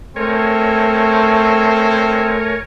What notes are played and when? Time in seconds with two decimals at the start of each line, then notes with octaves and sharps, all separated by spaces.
0.16 A3 C4 A#4 C#5 G#5